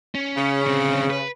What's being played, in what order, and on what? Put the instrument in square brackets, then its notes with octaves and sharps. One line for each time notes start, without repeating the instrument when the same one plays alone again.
[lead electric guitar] C#4
[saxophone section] C#3
[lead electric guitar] D3 C4
B4